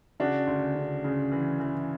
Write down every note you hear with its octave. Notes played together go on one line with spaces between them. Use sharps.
C#3 D4 F#4
D2
C#3
C#3
E3
E3